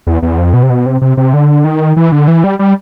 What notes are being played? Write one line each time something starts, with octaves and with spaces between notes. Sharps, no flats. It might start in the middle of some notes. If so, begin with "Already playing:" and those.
E2
E2
F2
B2
C3
B2
C3
C3
C3
D3
D#3
E3
D3
E3
G3
G3